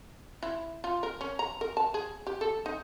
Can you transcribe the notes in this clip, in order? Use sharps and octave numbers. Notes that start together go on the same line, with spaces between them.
E4
F4
A#4
C#4
A#5
A#4
A5
G#4
G4
A4
D#4